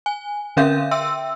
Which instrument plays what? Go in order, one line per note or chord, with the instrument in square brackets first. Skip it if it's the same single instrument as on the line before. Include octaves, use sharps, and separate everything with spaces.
[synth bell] G#5
D3 C#4 A#4 E5 F5 G6
E5 G5 C6 E6